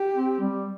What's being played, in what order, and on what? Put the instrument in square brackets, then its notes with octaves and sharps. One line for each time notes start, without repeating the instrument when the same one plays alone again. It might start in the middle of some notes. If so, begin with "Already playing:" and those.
Already playing: [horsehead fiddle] G4
[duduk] C4
G3